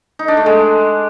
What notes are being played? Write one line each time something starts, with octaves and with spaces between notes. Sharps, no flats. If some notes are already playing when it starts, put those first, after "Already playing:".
D#4
D4
A3
G#3